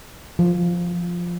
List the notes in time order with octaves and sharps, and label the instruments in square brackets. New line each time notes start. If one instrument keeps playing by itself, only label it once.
[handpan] F3